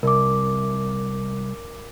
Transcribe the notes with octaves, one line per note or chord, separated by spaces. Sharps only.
C2 A#4 D6